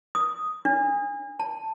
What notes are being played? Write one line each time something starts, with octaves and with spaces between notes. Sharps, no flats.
D#6
D4
A5